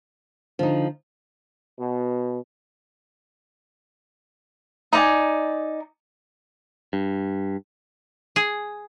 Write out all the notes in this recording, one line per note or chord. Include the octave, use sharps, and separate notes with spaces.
D3 F3 D#4
B2
D#4 D5 G#5
G2
G#4